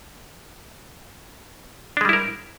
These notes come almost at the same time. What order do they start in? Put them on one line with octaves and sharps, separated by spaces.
D4 G#3 G3 E4 A#4